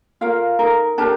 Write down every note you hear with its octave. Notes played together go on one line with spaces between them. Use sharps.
F4 A#4 F5
D#4 A#4
D4 G4 A#4 A5